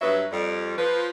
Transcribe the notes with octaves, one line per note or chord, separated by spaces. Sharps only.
G2 F#3 B4 E5
F2 G3
F3 B4